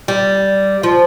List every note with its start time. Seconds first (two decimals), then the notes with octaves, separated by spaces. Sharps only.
0.08 G3
0.83 F3